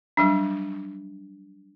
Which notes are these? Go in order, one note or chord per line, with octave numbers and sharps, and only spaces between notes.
F#3 G3 D4